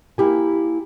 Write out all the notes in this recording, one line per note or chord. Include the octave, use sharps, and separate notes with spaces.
A#3 E4 G4 G#5